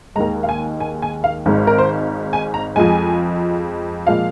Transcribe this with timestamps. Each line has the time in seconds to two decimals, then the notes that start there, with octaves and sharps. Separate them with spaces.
0.16 D#2 D#3 G#3 A#5
0.43 F5
0.49 G#5
0.80 G#5
1.02 G#5
1.24 F5
1.46 G#1 G#2 G#3
1.67 A#4
1.78 C5
2.33 G#5
2.54 A#5
2.76 F2 F3 G#3 G#5
4.07 A#2 F3 G#3 F5